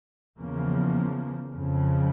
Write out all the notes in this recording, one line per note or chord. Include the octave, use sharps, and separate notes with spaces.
E2 C#3 F3 A#3
F2 C#3 F3